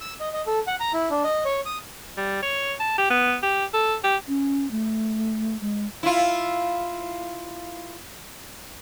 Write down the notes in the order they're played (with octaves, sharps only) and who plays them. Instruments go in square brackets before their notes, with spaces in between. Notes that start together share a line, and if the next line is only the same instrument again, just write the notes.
[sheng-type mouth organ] E6
D#5
D#5
A4
F#5
A#5
E4
D4
D#5
C#5
D#6
[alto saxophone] G3
C#5
A5
G4
B3
G4
A4
G4
[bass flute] C#4
A3
G#3
[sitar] E4 F4